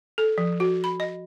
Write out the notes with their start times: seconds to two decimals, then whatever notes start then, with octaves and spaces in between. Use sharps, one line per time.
0.18 A4
0.38 F3
0.60 F#4
0.84 B5
1.00 D#5